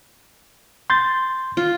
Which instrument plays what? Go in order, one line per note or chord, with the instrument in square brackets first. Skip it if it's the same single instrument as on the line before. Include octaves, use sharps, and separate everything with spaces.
[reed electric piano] C6 G6 A6
[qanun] F4